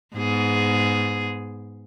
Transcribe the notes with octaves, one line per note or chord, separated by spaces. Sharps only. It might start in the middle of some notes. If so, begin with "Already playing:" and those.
G#2 B3 G#4